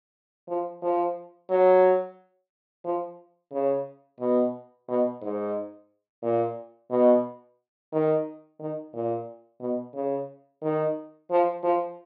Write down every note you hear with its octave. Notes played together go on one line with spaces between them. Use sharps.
F3
F3
F#3
F3
C#3
B2
B2
G#2
A#2
B2
D#3
D#3
A#2
B2
C#3
D#3
F3
F3